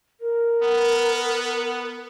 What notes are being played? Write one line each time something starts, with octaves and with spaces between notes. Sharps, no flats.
A#4
B3